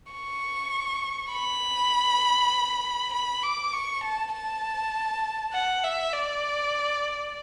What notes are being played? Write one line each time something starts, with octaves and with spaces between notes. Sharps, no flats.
C#6
B5
B5
D6
C#6
A5
A5
F#5
E5
D5